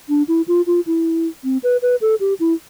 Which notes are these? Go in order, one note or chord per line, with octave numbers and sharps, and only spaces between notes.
D4
E4
F4
F4
E4
C4
B4
B4
A4
G4
E4